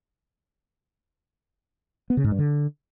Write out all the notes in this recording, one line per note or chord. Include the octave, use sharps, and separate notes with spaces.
B3
C#3
G#2
G2
D3